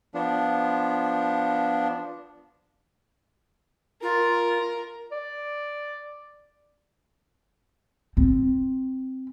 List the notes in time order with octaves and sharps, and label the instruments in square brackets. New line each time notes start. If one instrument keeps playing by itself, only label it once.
[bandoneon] F3 B3 D4
[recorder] F4 [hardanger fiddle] A#4
[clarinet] D5
[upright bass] C4